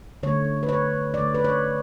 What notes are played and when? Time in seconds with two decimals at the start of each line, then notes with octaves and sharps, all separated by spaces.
0.23 D3 A3 C#5
0.63 B4
0.69 C#5
1.14 D3 A3 D5
1.35 B4
1.44 C#5